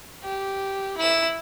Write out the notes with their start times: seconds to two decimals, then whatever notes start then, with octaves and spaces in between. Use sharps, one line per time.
0.22 G4
0.97 E4 E7